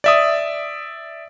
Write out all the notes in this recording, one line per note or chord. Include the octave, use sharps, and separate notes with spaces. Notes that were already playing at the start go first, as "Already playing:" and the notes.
D5 E5 D#6